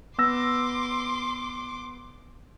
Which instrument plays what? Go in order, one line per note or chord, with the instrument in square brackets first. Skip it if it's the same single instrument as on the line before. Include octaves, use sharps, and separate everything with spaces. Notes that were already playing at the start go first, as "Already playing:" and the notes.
[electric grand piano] B3 E6 A#6 [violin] C6 D6